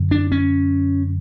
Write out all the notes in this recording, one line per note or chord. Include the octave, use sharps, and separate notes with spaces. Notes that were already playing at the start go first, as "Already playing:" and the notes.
Already playing: F#2 D3
D4
C#4